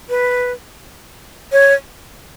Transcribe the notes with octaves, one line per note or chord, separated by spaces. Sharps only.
B4
C#5